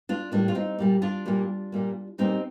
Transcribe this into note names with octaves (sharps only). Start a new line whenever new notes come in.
D4 F4
A2 G3 A#3 D4
F4
C4 D#4
A#2 G3 A#3
D4 F4
A#2 G3 A#3
A#2 G3 A#3
A#2 G3 A#3 C4 D#4